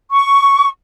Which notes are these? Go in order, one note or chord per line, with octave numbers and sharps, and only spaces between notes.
C#6